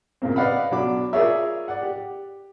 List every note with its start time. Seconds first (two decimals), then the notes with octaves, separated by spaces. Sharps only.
0.22 A#2 C#3 A#3 C4
0.36 B4 D5 D#5 F5 F#5 B5
0.71 B2 F#3 D4 F#4 B5 D6
1.13 F4 G#4 A#4 C#5 D5 E5
1.68 D5 F#5
1.82 G4